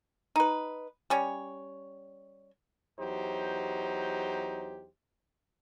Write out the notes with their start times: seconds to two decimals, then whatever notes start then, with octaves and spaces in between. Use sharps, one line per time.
0.36 D#4 B4
1.10 G3 C#4 C#5
2.99 E2 F#3 D#4 G4 C5